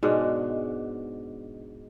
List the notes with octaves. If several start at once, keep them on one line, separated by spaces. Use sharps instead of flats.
G#2 B2 G#3 D4